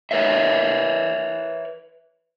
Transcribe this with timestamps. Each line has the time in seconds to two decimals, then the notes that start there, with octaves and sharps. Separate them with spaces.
0.11 A#4 B4 C#5 E5